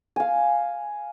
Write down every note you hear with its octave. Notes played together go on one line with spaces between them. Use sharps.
F5 G#5